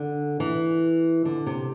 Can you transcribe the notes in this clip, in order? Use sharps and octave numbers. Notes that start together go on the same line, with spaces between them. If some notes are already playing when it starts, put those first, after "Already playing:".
Already playing: D3
E3
D3
C3